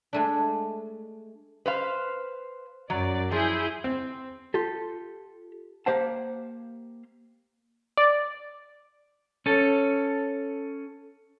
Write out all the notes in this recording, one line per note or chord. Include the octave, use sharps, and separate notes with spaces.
G#3 A3 D4
B4 C5 F5
F#2 F#3 D5
F3 E4 G#4 G6
C4
F4 G4 A4
A#3 G4 C5 F5 F#5 A5
D5
C#4 A4